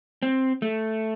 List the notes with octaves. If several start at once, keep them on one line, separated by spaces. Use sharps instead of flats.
C4
A3